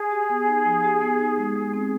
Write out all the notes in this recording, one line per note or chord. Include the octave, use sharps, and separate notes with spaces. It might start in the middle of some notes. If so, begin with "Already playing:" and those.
Already playing: G#4
G4
B3
D#4
F3
G4
B3
D#4
G#3
G#3
C4